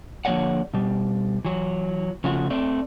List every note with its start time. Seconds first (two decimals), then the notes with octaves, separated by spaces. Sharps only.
0.25 D3 F3 A#3 C#5 D5 F#5
0.74 B2 G3
1.45 E3 F#3
2.24 C#3 F3 A3 F#4
2.50 A3 C4 D5